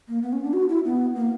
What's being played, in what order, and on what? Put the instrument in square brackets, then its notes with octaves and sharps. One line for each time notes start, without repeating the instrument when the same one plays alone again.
[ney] A#3
B3
C#4
D4
F#4
E4
B3
A#3